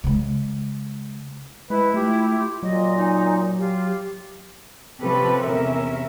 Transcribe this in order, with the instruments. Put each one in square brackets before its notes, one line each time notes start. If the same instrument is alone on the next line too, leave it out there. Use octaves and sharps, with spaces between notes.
[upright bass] C#3 G#3
[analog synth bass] G#3 [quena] E4 [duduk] B4
[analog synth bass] A3 [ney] F4 [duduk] G4
[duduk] A#2 [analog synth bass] F#3 [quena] D#5
[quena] D#4 [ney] G#5
[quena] F4 [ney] G4
[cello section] C3 F3 C#4 G4 A4 B4
E2 C3 C#4 A#4 E5